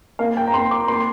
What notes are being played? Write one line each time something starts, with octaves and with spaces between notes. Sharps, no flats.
A#3 F5
G5
A#5
A#3 C6
D6
A#3 C6